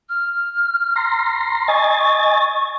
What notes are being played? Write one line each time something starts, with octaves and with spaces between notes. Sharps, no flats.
F6
A#5 C6
D#5 G#5 C#6 A6